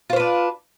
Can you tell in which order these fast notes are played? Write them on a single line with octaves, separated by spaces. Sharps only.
F4 C5 B4 D4